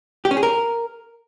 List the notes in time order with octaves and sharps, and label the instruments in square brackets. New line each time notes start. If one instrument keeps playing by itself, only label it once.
[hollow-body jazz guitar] G4
C#4
G#4
A#4